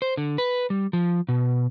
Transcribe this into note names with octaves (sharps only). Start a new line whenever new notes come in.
C5
D3
B4
G3
F3
B2